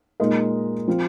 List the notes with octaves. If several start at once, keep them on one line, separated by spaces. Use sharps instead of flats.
A#2 G#3 D#4 A#4 D#5
F3 C4 F4